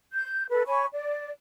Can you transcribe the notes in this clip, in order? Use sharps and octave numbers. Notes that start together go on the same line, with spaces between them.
G6
A4 B4
C#5 G#5 B5 C#6
D5